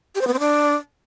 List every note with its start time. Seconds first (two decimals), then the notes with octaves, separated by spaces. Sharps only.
0.15 G4
0.21 C5
0.27 B3
0.33 C4
0.39 D4